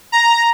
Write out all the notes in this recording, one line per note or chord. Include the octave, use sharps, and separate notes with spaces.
A#5